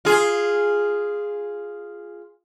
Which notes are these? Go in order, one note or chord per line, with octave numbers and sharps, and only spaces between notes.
F4 G#4